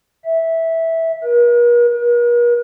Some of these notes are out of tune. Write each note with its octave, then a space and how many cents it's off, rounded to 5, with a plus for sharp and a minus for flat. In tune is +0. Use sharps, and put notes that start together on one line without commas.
E5 -10
A#4 +45
A#4 +45